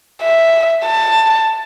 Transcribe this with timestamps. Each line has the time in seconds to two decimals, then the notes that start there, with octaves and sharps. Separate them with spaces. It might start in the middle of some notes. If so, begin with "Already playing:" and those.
0.22 E5
0.86 A5